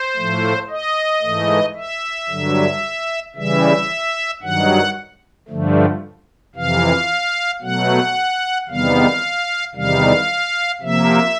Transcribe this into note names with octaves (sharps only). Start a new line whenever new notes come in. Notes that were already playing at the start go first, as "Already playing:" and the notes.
Already playing: C5
A2 F3 A3
D#5
G#2 E3 A3
E5
G2 D3 F#3
C#3 E3 G3 E5
G2 D#3 F#3 F#5
G2 D3 F3 A3
F2 C3 E3 F5
B2 F#3 A3 F#5
E2 C3 D#3 G3 B3 F5
E2 C3 D#3 G3 F5
C3 F3 A#3 E5